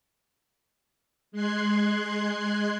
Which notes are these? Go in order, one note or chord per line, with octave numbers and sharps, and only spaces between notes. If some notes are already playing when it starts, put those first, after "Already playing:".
G#3 C6 F#6 G#6 C7